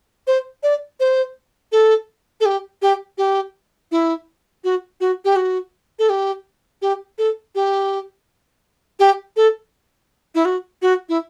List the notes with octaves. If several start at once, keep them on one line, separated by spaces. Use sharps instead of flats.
C5
D5
C5
A4
A4
G4
G4
G4
E4
F#4
F#4
G4
F#4
A4
G4
G4
A4
G4
G4
A4
E4
F#4
F#4
E4